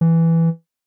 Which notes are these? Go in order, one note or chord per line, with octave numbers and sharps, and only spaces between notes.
E3